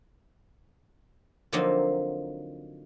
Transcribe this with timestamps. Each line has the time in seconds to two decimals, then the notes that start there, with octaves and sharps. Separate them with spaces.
1.53 D3 F3 F#3 A#3 C4 D#4